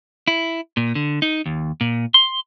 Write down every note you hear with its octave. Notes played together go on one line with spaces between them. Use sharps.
E4
A#2
D3
D#4
D#2
A#2
C6